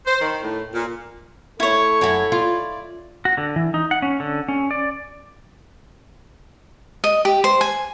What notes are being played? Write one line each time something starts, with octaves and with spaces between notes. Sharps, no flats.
C5
D#3
A2
A#2
A3 E4 A4 C#5 C#6
F#2 E4 F#4 C#5
F4 D5
F#4
D3
E3
D#4
F#5
C#4
D3
C#4
D5
D#5
G4
C5
G#5